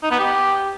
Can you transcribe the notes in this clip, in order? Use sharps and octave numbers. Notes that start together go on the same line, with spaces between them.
D#4
B3
G4